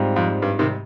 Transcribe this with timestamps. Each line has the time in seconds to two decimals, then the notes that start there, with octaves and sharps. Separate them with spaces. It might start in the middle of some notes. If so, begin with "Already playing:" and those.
Already playing: G#2 G3 C4 F4
0.16 F2
0.42 G2
0.59 C3 D#3